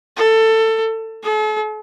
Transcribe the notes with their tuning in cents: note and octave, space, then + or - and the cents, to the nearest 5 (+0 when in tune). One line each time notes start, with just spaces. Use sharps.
A4 +20
A4 -45